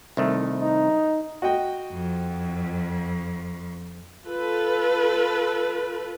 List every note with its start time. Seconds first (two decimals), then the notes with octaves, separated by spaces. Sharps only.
0.17 C2 D#3 A3
0.61 D#4
1.42 F#4 D#5 G5
1.92 F2
4.27 F4 A4 B4